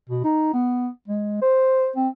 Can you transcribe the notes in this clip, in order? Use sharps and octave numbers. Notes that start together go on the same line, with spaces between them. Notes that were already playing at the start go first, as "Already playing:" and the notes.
B2
D#4
B3
G#3
C5
C4